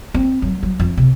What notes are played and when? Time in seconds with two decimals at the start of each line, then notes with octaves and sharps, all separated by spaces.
0.14 C4
0.42 F#3
0.63 F#3
0.80 F2
0.97 C3